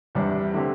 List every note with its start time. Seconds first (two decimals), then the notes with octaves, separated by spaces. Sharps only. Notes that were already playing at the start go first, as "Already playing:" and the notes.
0.15 E2 C3 G3 D4
0.54 D3 A3 C4 G4